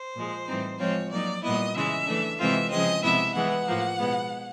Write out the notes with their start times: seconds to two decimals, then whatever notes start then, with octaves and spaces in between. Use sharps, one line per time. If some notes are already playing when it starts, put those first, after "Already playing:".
Already playing: C5
0.15 A#2 F3 G#3
0.48 A2 E3 G3 C4 D#4
0.79 F3 G#3 C4 F4 C#5
1.11 F#3 A#3 D#4 D5
1.43 A#2 G3 B3 E4 D#5
1.75 C#3 E3 G#3 E5
2.07 E3 A3 D4
2.39 C3 E3 G#3 C4 F4 E5
2.71 C#3 F3 G#3 C4 D#5
3.03 C3 F3 G#3 B3 E4 E5
3.34 E3 G#3 B3 F#5
3.67 A2 F3 A#3
3.99 B2 G#3 B3